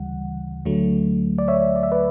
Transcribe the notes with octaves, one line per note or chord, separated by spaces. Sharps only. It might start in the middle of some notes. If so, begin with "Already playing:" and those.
Already playing: D2 C#3 E3 G3 F#5
D2 D3 F#3 A3
D5
C#5 E5
D5
E5
B4 D5